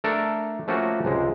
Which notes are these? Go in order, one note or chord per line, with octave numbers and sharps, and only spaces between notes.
A3 D4 A4 A#4
F3 A3 A#3 C#4 F4 F#4
C#2 C3 G#3